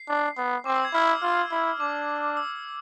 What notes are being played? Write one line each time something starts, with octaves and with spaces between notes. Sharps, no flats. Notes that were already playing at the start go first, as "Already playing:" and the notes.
Already playing: C7
D4
B3
C4 D6
E6
G#6
E4 F6
E6
F4 F6
E4
D4 D6
E6